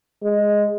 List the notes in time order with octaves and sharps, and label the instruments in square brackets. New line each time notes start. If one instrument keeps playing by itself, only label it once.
[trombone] G#3